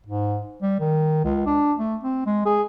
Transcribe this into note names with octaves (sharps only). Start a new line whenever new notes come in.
G#2
G3
D#3
C#2
D4
A3
C4
G#3
G#4